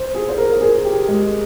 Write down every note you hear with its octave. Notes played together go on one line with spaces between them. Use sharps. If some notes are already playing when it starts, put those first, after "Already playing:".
Already playing: C5
G#4
C5
A#4
A#4
G#4
G4
G#3